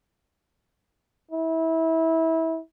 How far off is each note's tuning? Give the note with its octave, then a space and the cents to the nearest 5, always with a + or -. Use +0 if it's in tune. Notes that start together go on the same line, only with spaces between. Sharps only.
E4 -25